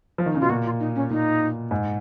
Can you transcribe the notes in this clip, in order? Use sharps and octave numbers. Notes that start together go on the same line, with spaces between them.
F3
D#3
C#3 D#4
B2 F4
A#2 F#4
F4
D#4
C#4
A#2 D#4
G#2